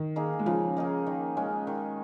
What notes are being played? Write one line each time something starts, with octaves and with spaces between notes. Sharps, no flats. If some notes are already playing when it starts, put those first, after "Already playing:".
Already playing: D#3
A#3 D#4 G#4
G#3
C#3 F3
A#3 D#4 G#4
D#3
G#3 C#4
D#3